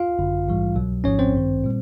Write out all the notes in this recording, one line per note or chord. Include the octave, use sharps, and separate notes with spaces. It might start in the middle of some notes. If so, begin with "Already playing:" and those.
Already playing: F4 F5
G#1 F#2 D3
A#1 G#2 E3 G3
C2 B2 F#3
G#1 G#2 F3 C#4 C#5
C4 C5
A1 G2 D#3
A#2 G3